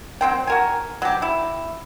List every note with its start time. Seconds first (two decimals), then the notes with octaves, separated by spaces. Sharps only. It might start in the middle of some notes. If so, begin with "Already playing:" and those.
0.21 F#3 C4 G5
0.47 F#4 A#4 G#5
1.02 F#3 G4
1.22 E4